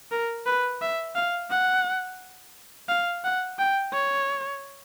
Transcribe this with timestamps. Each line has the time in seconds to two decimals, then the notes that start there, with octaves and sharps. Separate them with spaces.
0.12 A#4
0.46 B4
0.82 E5
1.16 F5
1.51 F#5
2.89 F5
3.24 F#5
3.59 G5
3.93 C#5